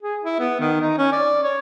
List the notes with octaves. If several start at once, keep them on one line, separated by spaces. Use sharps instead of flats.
G#4
E4
B3
D#3
D#4
C#4
D5
C#5